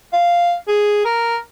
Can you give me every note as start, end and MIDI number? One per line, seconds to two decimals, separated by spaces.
0.13 0.54 77
0.68 1.00 68
1.05 1.37 70